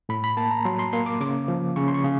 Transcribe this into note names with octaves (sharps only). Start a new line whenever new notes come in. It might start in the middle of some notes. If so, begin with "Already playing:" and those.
A2 B5
B5
A#3 A5
A#5
F#3 C6
C6
A#3 C6
D6
C#3 D6
F3
C#3 C#6
C6
C#6
C#3